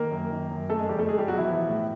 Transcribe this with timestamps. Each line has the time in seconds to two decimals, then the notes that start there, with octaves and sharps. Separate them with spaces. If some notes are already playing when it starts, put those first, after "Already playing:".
Already playing: D#3 A#3 A#4
0.11 F#2
0.30 D#3
0.50 F#2
0.69 C#3 A3 A4
0.79 G#3 G#4
0.89 F2 G3 G4
0.98 A3 A4
1.09 G#3 G#4
1.18 G3 G4
1.28 B2 F#3 F#4
1.38 E3 E4
1.48 F3
1.68 A2